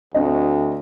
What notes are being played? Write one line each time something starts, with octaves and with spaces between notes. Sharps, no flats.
D2 C4 D#5